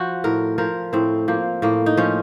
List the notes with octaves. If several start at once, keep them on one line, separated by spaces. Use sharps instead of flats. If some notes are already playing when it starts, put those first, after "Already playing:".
Already playing: F3 F#4
A2 A#4
F3 A#4
A2 C4
F3 A#3
A2 A#3
D#4
F3 C#4